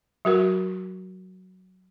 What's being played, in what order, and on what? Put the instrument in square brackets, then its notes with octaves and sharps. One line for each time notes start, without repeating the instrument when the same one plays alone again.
[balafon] F#3 F#4 A#4